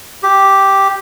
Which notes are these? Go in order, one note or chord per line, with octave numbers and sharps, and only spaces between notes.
G4